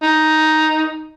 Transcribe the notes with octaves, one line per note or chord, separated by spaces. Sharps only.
D#4